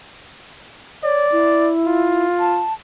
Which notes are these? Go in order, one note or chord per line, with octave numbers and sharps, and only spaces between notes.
C#5 D5
E4
F4
A5